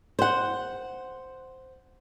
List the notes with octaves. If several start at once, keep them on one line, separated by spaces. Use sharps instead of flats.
C5 F#5